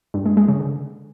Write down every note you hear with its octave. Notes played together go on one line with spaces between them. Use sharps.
G2
G#3
G#3
C#3
D3